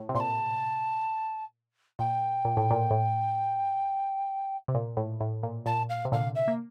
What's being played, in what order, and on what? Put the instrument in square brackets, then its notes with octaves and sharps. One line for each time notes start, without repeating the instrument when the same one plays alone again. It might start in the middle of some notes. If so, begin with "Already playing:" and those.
Already playing: [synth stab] A2
C3
[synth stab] A#2 [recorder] C6
[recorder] A5
[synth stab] A#2 [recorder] G5
[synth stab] A#2
A2
A#2
A2
C3
A#2
A2
A2
A#2
[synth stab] A#2 [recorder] A5
[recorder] F5
[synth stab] C3
[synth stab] A#2 D3 [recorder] F5
[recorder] E5
[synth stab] A#3